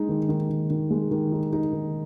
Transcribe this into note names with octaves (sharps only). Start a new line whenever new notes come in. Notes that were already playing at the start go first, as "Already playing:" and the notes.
Already playing: G#3 D#4
D#3
D#3
D#3
D#3
G#3
D#3
D#4
D#4
D#3